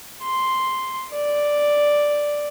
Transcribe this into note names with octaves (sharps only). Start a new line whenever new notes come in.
C6
D5